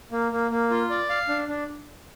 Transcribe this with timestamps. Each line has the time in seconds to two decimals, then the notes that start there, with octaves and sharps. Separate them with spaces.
0.12 A#3
0.32 A#3
0.51 A#3
0.70 F4
0.90 D5
1.10 F5
1.29 D4
1.48 D4